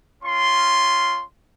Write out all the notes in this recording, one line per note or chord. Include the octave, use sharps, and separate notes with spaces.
C#4 F4 C6